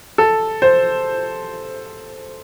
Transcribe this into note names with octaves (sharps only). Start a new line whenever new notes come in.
A4
C5